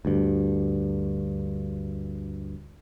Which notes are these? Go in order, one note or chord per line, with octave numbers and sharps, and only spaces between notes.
D2 G2